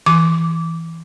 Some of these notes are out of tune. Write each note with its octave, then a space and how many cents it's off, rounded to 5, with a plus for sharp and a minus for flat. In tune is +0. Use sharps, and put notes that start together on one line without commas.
E3 +0 D6 -15